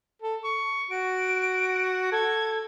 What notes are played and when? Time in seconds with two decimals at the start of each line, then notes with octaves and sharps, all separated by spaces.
0.22 A4
0.44 C#6
0.90 F#4 D7
2.12 A4 G#6